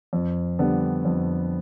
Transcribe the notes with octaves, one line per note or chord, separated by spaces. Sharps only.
F2
D3 G3 B3 D4
F2